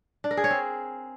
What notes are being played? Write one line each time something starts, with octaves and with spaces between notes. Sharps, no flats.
D4
A#4
G#4
C#5
C4